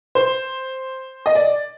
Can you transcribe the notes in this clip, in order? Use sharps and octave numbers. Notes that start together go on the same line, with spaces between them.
C5
D#5
D5